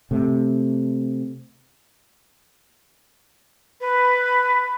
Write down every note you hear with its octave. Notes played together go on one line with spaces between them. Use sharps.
C3 A3
B4